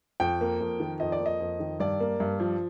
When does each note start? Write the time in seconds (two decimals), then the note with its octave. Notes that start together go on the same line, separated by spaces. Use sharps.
0.20 F2 G5
0.41 A#3
0.61 F2
0.80 D#3
1.00 F2 D#5
1.12 D5
1.20 A#3
1.26 D#5
1.40 F2
1.60 D#3
1.80 G2 D5
2.00 A#3
2.20 G2
2.40 F3